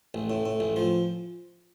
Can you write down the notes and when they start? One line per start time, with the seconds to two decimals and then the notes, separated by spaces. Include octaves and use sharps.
0.14 A1
0.30 A2
0.46 A2
0.60 A1
0.76 F3